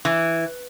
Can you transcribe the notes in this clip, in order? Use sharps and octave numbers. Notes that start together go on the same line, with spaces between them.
E3